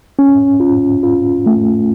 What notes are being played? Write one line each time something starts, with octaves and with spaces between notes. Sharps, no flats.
C#4
F4
F4
A3